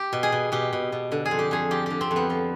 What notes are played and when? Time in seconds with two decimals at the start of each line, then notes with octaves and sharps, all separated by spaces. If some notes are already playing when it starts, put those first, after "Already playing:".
Already playing: G4
0.13 B2
0.23 G#4
0.32 B2
0.52 B2 G4
0.73 B2
0.92 B2
1.12 D3
1.25 G#4
1.31 F2
1.39 G4
1.51 F2 G#4
1.71 F3 G4
1.86 D3 G4
2.01 C4
2.11 F2
2.16 B3
2.30 F3